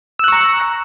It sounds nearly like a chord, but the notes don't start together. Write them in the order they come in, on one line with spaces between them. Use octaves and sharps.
E6 F#6 C#6 A#5